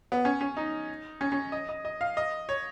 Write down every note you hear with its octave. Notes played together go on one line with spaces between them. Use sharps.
B3
C#4
C#4
D#4
C#4
C#4
D#5
D#5
D#5
F5
D#5
C#5